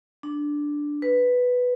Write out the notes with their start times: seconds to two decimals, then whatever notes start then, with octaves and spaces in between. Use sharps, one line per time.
0.23 D4
1.02 B4